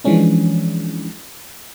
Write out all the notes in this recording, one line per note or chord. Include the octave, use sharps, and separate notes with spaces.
E3 F3 G#3 C#4 D4